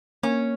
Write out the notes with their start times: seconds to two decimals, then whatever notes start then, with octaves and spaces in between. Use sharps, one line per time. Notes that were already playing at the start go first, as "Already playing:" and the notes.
0.23 A#3 C#4